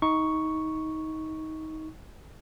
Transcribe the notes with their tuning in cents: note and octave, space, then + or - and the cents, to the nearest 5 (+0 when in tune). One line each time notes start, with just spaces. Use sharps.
D#4 +20 C#6 +0